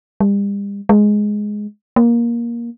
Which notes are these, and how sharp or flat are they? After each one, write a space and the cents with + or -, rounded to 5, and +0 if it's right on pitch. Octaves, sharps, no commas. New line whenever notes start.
G3 +40
G#3 +5
A#3 +15